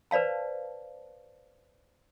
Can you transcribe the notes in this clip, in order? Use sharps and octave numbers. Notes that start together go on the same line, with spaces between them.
B4 C5 D5 F5 A5